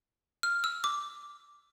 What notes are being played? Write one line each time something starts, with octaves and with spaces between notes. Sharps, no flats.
F6
E6
D6